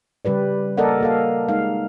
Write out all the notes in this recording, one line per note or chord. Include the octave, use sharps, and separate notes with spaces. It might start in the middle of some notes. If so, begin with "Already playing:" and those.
C#3 G3 G4 B4 D5
A#3 A4 A#4 D5 D#5 F#5
A#3 A4 F5
G#3 D#4 F5